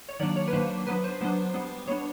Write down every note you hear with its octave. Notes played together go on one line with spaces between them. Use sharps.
C#5
D#3 F#3 A#3 D4 D5
C#5
B4
D#3 F#3 A#3 D4 C5
F#3 B3 D4 B4
C5
F#3 B3 D4
G3 B3 D4
G3 B3 D4 C#5